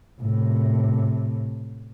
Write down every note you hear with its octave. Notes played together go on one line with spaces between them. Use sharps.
A2 C3